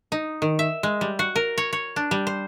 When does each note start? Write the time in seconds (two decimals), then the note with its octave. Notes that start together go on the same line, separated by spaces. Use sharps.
0.12 D#4
0.42 D#3
0.59 E5
0.83 G#3
1.01 G3
1.19 F#4
1.36 A#4
1.58 C#5
1.73 C#5
1.96 D4
2.11 G3
2.27 C5